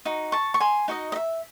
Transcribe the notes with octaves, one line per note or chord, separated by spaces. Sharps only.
D#4 F#4
A5 C#6
C#6
G#5 C6
D#4 F#4 D#5
D#5
E5